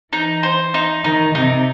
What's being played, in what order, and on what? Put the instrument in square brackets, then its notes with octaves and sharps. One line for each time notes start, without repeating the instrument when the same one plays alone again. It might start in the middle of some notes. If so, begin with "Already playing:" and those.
[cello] E3 [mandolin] D#4
[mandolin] C5
D#4
[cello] D#3 [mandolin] D#4
[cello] C3 [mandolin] D#4